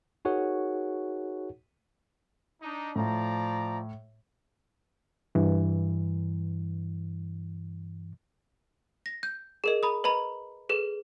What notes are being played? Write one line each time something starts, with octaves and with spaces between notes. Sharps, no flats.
D#4 F#4 G#4 A#4 C#5 F#5
D4 D#4
A2 F3 D5 A#5
G2 E3
A#6
G6
G#4 A#4 D#5
A#5 B5 D#6
B4 D#5 A#5 B5
G#4 A4 B4